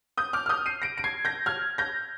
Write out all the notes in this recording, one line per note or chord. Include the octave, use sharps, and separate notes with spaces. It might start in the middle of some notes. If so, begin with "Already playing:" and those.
D#6 G6
D6 F6
F6
D#6 G6
C7 D#7
A#6 D7
D7
G#6 C7
G6 A#6
F6 G#6
G6 A#6